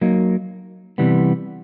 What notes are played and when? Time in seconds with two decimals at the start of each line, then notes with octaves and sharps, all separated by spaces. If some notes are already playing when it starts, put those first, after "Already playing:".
0.01 F#3 A#3 D#4
0.98 C3 E3 G3 B3